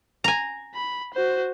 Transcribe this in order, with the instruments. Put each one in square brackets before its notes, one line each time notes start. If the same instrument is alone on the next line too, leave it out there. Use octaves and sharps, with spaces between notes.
[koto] G#5 A#5
[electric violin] B5
F#4 C5